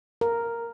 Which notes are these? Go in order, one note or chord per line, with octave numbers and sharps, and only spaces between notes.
A#4